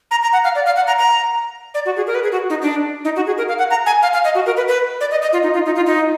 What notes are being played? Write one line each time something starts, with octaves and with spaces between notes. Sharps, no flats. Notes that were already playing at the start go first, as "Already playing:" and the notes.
A#5
A#5
F#5
F5
D5
F5
F#5
A#5
A#5
D5
F#4
G#4
A#4
B4
G#4
F#4
D#4
D4
D#4
F#4
G#4
A#4
F5
F#5
A#5
G#5
F5
F5
D#5
F#4
A#4
B4
B4
D5
D#5
D#5
F4
D#4
F4
D#4
F4
D#4